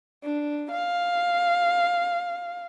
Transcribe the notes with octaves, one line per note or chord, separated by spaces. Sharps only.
D4
F5